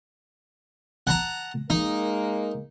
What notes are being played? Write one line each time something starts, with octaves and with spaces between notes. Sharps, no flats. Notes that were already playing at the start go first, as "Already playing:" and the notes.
F#5 A5 A#5
G#3 A#3 D#4 A#4